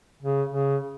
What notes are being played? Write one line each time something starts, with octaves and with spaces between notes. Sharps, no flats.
C#3
C#3